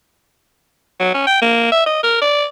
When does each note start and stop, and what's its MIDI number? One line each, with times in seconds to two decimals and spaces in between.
1.00 1.12 54
1.14 1.26 61
1.27 1.40 79
1.42 1.69 58
1.72 1.83 76
1.86 1.99 75
2.03 2.17 70
2.22 2.45 74